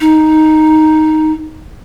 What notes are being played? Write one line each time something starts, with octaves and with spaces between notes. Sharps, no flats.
D#4